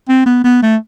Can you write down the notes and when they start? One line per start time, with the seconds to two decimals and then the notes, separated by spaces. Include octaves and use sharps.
0.09 C4
0.26 B3
0.44 B3
0.62 A3